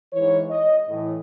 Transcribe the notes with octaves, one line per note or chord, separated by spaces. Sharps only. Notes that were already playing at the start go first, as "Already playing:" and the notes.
G#2 E3 C#5
D#5
A2 E3